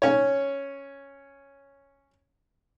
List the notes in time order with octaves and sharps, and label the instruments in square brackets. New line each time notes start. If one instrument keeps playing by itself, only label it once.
[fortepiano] C#4 C#5